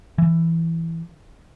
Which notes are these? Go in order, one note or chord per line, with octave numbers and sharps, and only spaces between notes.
E3